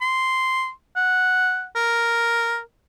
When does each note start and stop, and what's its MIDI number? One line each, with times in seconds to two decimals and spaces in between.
0.01 0.70 84
0.96 1.65 78
1.76 2.59 70